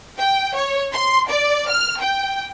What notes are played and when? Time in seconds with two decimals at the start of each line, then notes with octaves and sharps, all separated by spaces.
0.17 G5
0.54 C#5
0.92 C6
1.28 D5
1.69 F6
1.99 G5